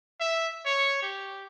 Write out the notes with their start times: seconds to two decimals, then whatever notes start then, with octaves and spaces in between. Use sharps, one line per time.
0.20 E5
0.66 C#5
1.02 G4